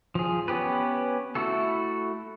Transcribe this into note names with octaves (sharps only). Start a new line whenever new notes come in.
F3 G#4
B3 C#4 G4 B4
A3 E4 F#4 A4